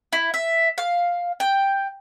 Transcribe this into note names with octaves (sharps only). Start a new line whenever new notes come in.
E4
E5
F5
G5